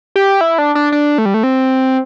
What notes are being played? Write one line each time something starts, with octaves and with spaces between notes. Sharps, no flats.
G4
E4
D4
D4
D4
A3
G3
A3
C4